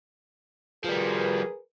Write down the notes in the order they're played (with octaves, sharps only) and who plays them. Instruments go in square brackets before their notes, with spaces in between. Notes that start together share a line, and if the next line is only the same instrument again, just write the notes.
[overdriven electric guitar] F3 G3 [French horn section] G#4 A#4 B4